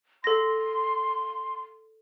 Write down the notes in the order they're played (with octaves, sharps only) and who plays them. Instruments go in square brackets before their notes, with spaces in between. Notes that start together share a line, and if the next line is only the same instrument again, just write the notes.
[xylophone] A4 A#6 [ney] C6